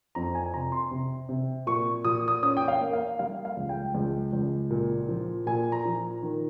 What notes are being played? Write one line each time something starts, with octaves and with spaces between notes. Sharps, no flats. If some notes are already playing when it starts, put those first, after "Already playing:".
F2 A#5
G#5
C3 A#5
C6
C3
C3
A#2 C#6
A#2 D#6
D#6
C#4 D#6
G5
F5
A#3
F5
G3 F5
F5
C#2
G5
C#2
C#2
A#2
F3
A#2 G#5
A#5
F3
D#3